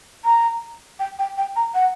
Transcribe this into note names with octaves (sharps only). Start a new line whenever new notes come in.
A#5
G5
G5
G5
A#5
F#5